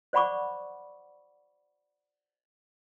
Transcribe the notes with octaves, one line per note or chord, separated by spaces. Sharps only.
C5 D5 F#5 B5 C#6 D6